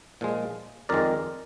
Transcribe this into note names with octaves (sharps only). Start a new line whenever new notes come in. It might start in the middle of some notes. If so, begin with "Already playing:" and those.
A#2 F3 G#3
F2 D#3 G#3 A#4 D5